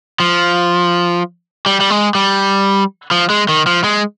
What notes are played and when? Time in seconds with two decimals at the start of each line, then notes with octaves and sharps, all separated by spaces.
0.20 F3
1.66 G3
1.80 G3
1.90 G#3
2.15 G3
3.11 F3
3.30 G#3
3.49 D#3
3.67 F3
3.84 G#3